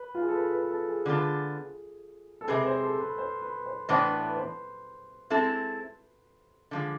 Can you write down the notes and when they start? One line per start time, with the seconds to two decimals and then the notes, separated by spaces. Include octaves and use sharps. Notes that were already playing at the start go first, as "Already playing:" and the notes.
Already playing: B4
0.15 F4
0.21 G#4
0.28 A4
0.35 B4
0.53 B4
0.71 A4
0.88 G#4
1.06 D3 G#3 B3 F4 A4
2.41 A4
2.48 C3 G#3 C4 G#4 B4
2.65 C5
2.83 A4
3.00 B4
3.18 C5
3.42 B4
3.66 C5
3.89 A2 E3 B3 D4 C5
4.13 B4
4.36 C5
5.30 G#3 C4 E4 A4
6.71 D3 F3 G#3